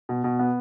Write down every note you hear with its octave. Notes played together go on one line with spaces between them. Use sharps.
B2
B2
B3